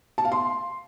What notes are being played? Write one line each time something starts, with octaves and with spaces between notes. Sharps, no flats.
A5
F5
C6